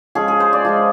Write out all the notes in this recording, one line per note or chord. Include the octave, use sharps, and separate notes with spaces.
F3 G#3 C#4 G#4
G#4
C5
D5
F3 G#3 C#4